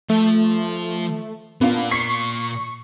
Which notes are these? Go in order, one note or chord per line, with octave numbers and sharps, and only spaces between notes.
F3 A3
A#2 A#3 B3 D4 F4
C#6 B6 C7